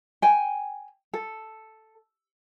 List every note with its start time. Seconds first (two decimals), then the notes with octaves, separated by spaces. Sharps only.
0.22 G5 G#5
1.14 A4